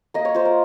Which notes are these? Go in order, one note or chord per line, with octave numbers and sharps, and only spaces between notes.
A#3 D#5
C#5
F4 C5
A#4